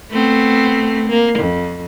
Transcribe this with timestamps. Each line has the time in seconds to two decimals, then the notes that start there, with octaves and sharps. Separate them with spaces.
0.11 A3 B3 C4
1.09 A#3
1.39 F2